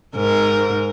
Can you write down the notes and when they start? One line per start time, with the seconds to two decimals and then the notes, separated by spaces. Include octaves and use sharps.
0.16 G#2 A#4